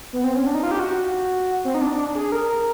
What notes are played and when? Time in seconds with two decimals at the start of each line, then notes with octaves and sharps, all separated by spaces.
0.13 B3
0.24 C4
0.35 C#4
0.46 D4
0.54 D#4
0.63 F4
0.71 G4
0.80 F#4
1.65 C4
1.75 D#4
1.81 D4
1.93 D4
2.15 G#4
2.32 A#4
2.49 A#4